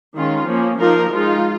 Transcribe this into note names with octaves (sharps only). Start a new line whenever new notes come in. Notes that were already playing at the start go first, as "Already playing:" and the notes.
D#3 G#3 C#4 F4
F3 A#3 C#4
F3 A#3 D#4 F4 A#4
F3 G#3 D#4 F4